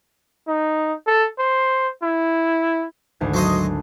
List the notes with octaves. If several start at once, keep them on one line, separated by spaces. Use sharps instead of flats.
D#4
A4
C5
E4
G#1 D2 G#6
F#3 C5 D#5